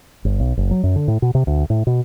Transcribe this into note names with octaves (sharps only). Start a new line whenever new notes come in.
G1
B1
F#1
F#3
F#2
D3
A2
B2
C3
D2
A2
B2